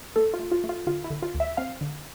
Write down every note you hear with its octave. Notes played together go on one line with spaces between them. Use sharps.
A3 A4
F4
A3
F4
A3
F4
D3 F4
E4
D3
F4
D2
E5
C4 F5
D3